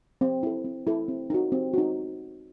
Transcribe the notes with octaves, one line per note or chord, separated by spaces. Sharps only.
C4
E4 A4
C4
E4 A4
C4
D#4 F#4
C4
D#4 F#4